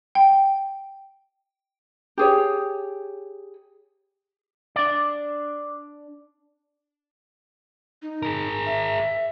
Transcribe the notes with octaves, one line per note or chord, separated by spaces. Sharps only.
G5
G4 G#4 C#5
D4 D5
D#4
G#4 A#4
E5